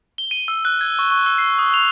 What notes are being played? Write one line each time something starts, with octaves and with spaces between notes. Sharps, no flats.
G7
D#7
E6
F#6
G#6
C#6
C#6
E6
C7
D#6
F7